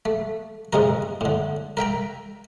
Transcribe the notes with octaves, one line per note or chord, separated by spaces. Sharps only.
A3
C#2 G#2 C3 G#3 A#4
A2 D3
A#4 E5 G5 A#5